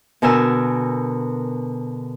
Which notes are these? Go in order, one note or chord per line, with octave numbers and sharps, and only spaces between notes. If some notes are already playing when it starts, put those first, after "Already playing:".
B2 D3 A#4 G#5 E6